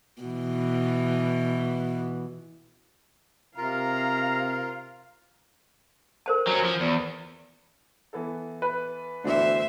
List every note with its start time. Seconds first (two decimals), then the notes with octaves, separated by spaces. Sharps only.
0.22 B2 E3
3.58 C3 F4 A#4 F5 A#5
6.26 A#4 C5 A5
6.47 F#3 C#4
6.65 F3
6.80 E2
8.13 E3 B3 A4
8.62 B4
9.24 D2 E3 B3 D4 C5 E5